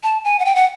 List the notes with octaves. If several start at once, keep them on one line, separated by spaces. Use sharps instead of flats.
A5
G#5
F#5
G5
F#5